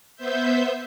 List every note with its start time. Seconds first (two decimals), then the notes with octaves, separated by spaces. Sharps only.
0.16 B3 C5 E5 G6